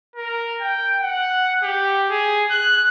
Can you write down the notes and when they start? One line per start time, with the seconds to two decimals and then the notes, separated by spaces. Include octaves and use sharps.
0.16 A#4
0.61 G5
1.02 F#5
1.63 G4
2.11 G#4
2.51 F#6